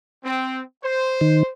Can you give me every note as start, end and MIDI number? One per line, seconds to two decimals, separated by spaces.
0.24 0.62 60
0.83 1.51 72
1.21 1.43 51